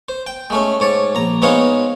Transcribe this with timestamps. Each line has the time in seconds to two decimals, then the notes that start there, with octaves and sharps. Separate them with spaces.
0.09 C5
0.27 G5
0.50 G#3 A3 C#4
0.80 G#2 C#5 D5
1.15 A#1 A#5
1.42 G#3 B3 C4 D#4 C#5 F5